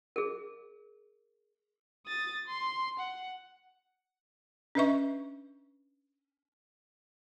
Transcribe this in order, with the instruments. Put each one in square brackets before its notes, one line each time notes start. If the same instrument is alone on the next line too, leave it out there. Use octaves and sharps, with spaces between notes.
[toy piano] G#4 A#4
[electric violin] D#6 A6
C6
F#5
[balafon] C#4 D4 B4 D#5 E5 C#6